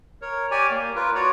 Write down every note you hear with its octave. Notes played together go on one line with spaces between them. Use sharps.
A#4 C#5
G4 C#5 D5 G#5
A#3
F4 A#4 B4
F4 F#4 C#5 D5